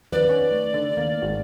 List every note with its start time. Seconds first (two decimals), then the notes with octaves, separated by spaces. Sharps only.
0.12 F2 D#3 B4 D5
0.29 C#4 C#5 F#5
0.51 A3
0.74 D3
0.97 D#3 A#3 F5
1.22 G#1 F#4